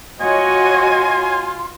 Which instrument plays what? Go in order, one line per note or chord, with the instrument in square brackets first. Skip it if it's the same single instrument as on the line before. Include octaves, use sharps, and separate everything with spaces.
[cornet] F4 [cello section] F#4 C#5 D#5 [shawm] G#5 [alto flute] C6